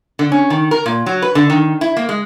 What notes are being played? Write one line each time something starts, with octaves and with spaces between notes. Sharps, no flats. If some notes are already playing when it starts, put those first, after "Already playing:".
D3
C#4
D#3
A#4
A#2
F#3
B4
D3
D#3
E4
A#3
G#3